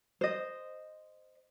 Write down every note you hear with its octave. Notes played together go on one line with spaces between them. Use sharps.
C5 D#5